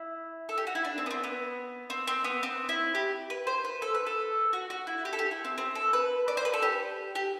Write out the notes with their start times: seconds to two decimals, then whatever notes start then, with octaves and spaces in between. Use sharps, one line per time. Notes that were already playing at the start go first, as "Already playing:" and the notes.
Already playing: E4
0.49 A4
0.58 G4
0.67 F#4
0.75 E4
0.85 D4
0.98 C4
1.06 B3
1.11 C4
1.24 B3
1.90 C4
2.07 C4
2.24 B3
2.43 C4
2.69 E4
2.95 G4
3.30 B4
3.47 C5
3.65 B4
3.82 A4
3.95 B4
4.07 A4
4.53 F#4
4.70 F#4
4.87 E4
5.05 G4
5.13 A4
5.19 G4
5.31 E4
5.45 C4
5.58 C4
5.75 A4
5.93 B4
6.28 D5
6.37 C5
6.45 B4
6.54 A4
6.62 G4
7.15 G4